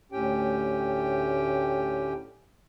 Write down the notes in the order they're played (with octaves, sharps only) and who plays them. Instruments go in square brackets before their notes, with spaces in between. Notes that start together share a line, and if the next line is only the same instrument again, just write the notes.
[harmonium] D2 A2 C#4 G4 G5